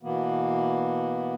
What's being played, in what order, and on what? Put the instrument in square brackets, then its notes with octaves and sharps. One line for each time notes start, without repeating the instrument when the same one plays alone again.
[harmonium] B2 E3 A#3 B3